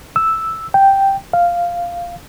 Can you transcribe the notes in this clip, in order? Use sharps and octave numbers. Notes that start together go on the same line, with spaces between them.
E6
G5
F5